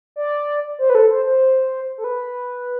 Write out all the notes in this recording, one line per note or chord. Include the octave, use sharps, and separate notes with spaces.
D5
C5
B4
A4
C5
C5
A4
B4